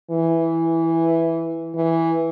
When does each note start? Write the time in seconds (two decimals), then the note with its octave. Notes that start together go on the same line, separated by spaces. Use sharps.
0.11 E3
1.75 E3